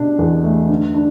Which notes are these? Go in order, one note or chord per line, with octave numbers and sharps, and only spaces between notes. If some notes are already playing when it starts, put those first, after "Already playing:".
Already playing: B2 D4
E2
A3
D3
D4